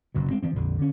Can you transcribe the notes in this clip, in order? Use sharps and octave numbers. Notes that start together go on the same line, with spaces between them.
F#1 F#2 B2
G#3 C4
E3 F3 C4
A#1 F2 D3
D3 C#4